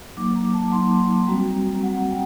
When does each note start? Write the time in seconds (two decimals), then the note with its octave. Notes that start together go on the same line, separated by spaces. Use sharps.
0.17 F#3 A#3 D#4 D6
0.35 A#5
0.54 A5
0.72 F#3 A#3 D#4 C6
1.27 G3 C4 F#4 A#5
1.83 G3 C4 F#4 F#5
2.10 G5